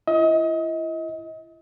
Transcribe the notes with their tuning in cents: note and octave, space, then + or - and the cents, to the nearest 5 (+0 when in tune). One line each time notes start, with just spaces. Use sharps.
E4 +40 D#5 +35